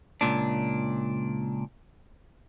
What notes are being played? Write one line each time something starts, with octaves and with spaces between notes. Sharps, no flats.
C#2 A#2 D4